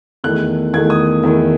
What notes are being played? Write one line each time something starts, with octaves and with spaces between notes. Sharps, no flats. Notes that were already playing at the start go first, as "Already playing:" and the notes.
E2 D#3 A3 F#6
E2 D#3 A3 G#6
D#6
E2 D#3 A3